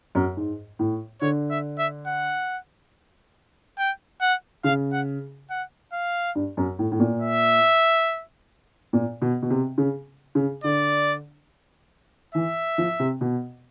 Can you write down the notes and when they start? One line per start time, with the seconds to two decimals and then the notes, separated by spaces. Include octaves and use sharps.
0.15 F#2
0.37 G#2
0.79 A2
1.21 D3 C#5
1.51 E5
1.79 E5
2.07 F#5
3.78 G5
4.21 F#5
4.64 C#3 F5
4.93 F#5
5.50 F#5
5.93 F5
6.35 G2
6.57 F#2
6.79 A2
6.92 A2
6.99 A#2
7.21 E5
8.93 A#2
9.22 B2
9.42 B2
9.50 C3
9.78 C#3
10.35 C#3
10.64 D3 D5
12.35 E3 E5
12.78 F3
13.00 C3
13.21 B2